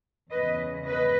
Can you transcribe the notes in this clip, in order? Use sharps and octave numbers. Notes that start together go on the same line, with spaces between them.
E2 C#3 G#3 B4 D#5
B4 D#5